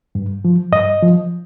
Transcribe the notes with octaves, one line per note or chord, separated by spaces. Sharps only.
G2
F3
G2 D#5
F3